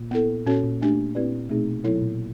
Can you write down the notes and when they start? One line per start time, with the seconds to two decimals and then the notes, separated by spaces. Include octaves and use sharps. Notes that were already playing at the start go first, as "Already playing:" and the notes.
Already playing: A#2
0.11 B3 E4 A4
0.46 A#2 C#4 F#4 A4 C#5
0.64 A#2
0.81 A3 D4 G4
1.15 C4 E4 G4 B4 D5
1.49 B2 A3 C4 D#4 G#4
1.84 B2 F#3 B3 E4 A4 C#5
2.02 A#2